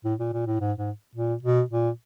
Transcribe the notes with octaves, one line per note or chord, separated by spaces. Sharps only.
A2
A#2
A#2
A2
G#2
G#2
A#2
B2
A#2